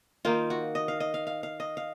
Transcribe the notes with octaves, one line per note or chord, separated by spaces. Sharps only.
D#3 A#3 D#4 F4
F#4
D#5
F5
D#5
F5
F5
F5
D#5
F5